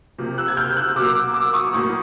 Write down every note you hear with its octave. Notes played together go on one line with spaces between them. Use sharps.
C3 F3 A#3
E6 F#6
G#6
F6 G6
E6 F#6
B2 F#3 A#3 D6 E6
D6 E6
C#6 D#6
A2 F#3 A#3 C#6 D#6